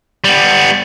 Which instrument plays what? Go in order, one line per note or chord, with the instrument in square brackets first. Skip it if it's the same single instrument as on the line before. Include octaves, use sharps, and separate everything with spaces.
[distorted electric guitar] G3 B3